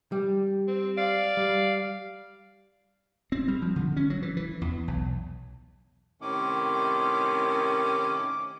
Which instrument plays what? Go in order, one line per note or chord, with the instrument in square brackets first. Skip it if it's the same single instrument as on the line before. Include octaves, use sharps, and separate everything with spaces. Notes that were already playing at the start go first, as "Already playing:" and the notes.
[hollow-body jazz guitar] G3
[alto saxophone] C4
[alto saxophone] D5 [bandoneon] F5
[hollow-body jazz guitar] G3
[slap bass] C4
G3
F3
D3
C#4
F#3
E3
E3
E2
B1
[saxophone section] A2 C3 D#3 [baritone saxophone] C#4 [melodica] D6